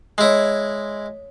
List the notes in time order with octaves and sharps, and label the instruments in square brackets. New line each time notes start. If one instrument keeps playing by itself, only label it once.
[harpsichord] G#3 E4 [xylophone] C#5 C7